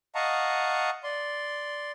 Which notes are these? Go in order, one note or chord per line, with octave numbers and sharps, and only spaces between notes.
D#5 F5 F#5 A5 A#5 C#6
D5 C6